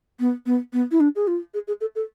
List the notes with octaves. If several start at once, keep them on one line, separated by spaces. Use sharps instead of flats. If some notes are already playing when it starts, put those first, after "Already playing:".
B3
B3
B3
E4
D4
G#4
F4
G#4
G#4
A4
A4